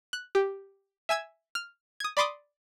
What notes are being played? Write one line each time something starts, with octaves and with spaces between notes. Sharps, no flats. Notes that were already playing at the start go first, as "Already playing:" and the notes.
F#6
G4
E5 G#5 E6 G#6
F6
D#6 G#6
D5 B5 C6 D6 D#6